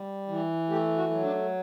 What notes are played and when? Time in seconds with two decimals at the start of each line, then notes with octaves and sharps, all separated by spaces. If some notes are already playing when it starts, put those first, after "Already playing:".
Already playing: G3
0.28 E3
0.69 A3 G4
0.97 F#4
1.11 F#3
1.24 D4